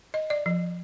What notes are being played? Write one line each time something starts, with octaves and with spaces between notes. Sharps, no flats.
D#5
D5
F3